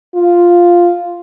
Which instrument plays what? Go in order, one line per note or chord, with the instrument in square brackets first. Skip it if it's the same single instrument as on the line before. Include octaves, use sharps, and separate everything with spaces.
[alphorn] F4